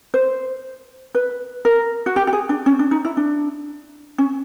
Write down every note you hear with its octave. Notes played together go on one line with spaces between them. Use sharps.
C5
B4
A#4
F#4
G4
G4
G#4
D4
C#4
D4
D#4
E4
D4
C#4